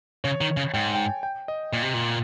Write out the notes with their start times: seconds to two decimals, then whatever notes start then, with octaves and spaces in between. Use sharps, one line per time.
0.24 C#3 C#5
0.41 D#3
0.57 C#3
0.74 G#2 G5
0.94 G5
0.99 G#5
1.23 G5
1.48 D#5
1.73 A#2
1.83 C3
1.94 A#2